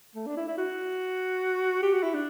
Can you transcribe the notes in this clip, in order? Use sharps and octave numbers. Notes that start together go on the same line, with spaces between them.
A3
D4
E4
E4
F#4
G4
F#4
E4
D4